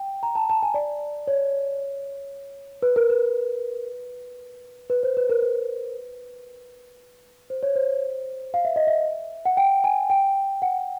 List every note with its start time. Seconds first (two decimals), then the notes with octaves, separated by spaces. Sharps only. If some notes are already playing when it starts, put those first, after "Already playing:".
Already playing: G5
0.23 A#5
0.35 A5
0.50 A5
0.63 G#5
0.74 D5
1.27 C#5
2.82 B4
2.96 A#4
3.10 B4
4.90 B4
5.03 C5
5.17 B4
5.29 A#4
5.42 B4
7.50 C5
7.63 C#5
7.75 C5
8.54 F5
8.65 E5
8.76 D#5
8.87 E5
9.45 F#5
9.57 G5
9.84 G#5
10.10 G5
10.62 F#5